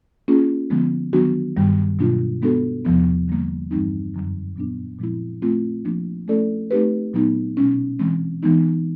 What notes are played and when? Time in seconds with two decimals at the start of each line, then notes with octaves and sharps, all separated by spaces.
0.28 A#3 C#4 F4 G#4
0.70 D3 F3 G#3 B3
1.13 D#3 F#3 B3 D4 F#4
1.57 G2 D#3 G3
1.99 B2 F#3 A#3 D4 F4
2.42 G#3 B3 D4 F#4 A4
2.85 E2 C3 F3 G#3 B3
3.28 D3 G3 A#3
3.71 G2 E3 G3 C4 D#4
4.14 F#2 D3 F#3
4.56 A#2 F#3 B3 D4
4.99 A#2 F3 G#3 C4 E4
5.42 A3 C4 F4
5.85 F3 A#3 D4
6.28 A3 C#4 E4 A4 D5
6.71 A3 C4 D#4 G4 B4
7.13 A#2 F#3 B3 D#4
7.57 B2 G#3 C#4
7.99 E3 G#3 C4
8.43 E3 G#3 B3 D#4